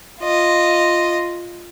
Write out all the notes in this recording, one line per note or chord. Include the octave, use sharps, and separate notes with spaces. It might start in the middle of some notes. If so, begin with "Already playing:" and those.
F4 D#5